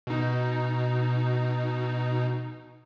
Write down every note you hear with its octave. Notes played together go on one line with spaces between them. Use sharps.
B2 D#4